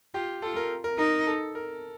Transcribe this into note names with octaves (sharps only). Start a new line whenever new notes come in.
F4 G4
F4 A4
A#4
A#4
D#4 A#4
A4
A#4